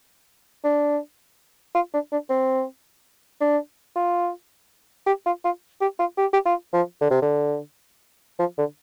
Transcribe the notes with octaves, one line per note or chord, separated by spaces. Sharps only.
D4
F4
D4
D4
C4
D4
F4
G4
F4
F4
G4
F4
G4
G4
F4
F3
D3
C3
D3
F3
D3